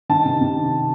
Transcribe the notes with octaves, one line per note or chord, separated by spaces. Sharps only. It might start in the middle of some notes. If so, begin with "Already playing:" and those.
D#3 A5
C3
C3